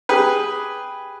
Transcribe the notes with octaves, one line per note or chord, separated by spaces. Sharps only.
G4 G#4 B4